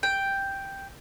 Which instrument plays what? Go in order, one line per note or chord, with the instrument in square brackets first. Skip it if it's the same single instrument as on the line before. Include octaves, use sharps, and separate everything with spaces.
[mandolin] G5